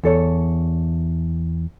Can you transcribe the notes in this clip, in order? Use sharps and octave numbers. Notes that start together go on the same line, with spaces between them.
E2 A4 C#5